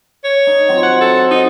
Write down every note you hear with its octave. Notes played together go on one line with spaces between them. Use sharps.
C#5
D#4
F#3 C4
F#5
A4
D#4